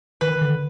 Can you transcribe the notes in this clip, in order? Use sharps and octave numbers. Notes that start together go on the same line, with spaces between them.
D#3 B4
D3